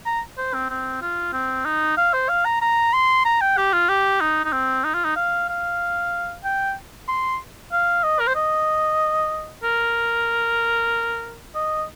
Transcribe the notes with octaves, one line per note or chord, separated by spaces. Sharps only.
A#5
C5
C4
C4
F4
C4
D#4
F5
C5
F5
A#5
A#5
C6
A#5
G5
G4
F4
G4
D#4
D#4
C4
D#4
F4
D#4
F5
F5
G5
C6
F5
D#5
A#4
C5
D#5
A#4
D#5